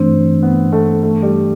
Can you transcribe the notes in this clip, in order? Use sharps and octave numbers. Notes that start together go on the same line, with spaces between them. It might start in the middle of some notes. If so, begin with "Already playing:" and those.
Already playing: G2 E3 A3 C4 D4
B3
A3
A3
G3